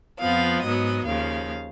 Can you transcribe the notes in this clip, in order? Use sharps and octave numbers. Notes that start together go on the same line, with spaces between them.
F2 F3 B3 F5
G#2 F#3 B3 D#5
D#2 C#3 F3 F5